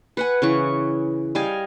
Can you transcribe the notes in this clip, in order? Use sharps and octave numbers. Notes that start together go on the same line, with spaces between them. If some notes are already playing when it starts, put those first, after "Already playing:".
B4 F#5 G#5
C#3 E3 C#6
G3 D#5 F5 G#5